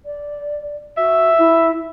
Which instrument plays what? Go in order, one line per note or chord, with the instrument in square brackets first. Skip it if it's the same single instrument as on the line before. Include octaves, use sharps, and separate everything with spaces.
[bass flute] D5
[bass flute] F#4 [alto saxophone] E5
[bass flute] E4